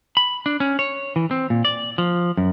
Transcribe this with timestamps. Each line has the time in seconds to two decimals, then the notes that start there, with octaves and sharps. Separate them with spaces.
0.17 B5
0.46 D4
0.60 C#4
0.79 C#5
1.16 E3
1.31 C4
1.50 A#2
1.65 D5
1.98 F3
2.37 F#2